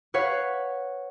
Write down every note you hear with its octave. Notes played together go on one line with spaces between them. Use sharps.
B4 C#5 F5 F#5